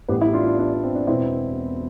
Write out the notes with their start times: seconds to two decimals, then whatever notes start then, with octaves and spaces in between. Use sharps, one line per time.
0.08 A1 A2 G3 B3 G4 B4
0.21 E4 G4
0.33 D4 F4
0.46 D4
0.59 D4
0.71 D4
0.83 C4
0.95 D4
1.07 E1 E2 B2 B3 C4 E4